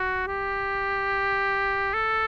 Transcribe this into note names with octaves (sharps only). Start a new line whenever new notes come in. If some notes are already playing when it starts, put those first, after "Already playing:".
Already playing: F#4
G4
A4